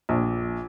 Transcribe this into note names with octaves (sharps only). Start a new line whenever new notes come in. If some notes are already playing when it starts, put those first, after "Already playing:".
A#1